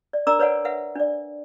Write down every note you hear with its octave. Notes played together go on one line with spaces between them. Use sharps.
D5
D4 A#4 D5 A#5 D6 E6
B4 C#5 D5 F#5 G#5
B4 E5 F#5
D4 D5